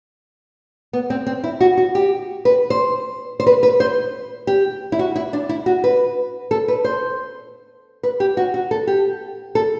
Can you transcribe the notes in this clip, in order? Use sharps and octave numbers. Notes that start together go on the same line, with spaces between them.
B3
C4
C4
E4
F#4
F#4
G4
B4
C5
C5
B4
B4
C5
G4
E4
F#4
E4
D4
E4
F#4
B4
A4
B4
C5
B4
G4
F#4
F#4
A4
G4
A4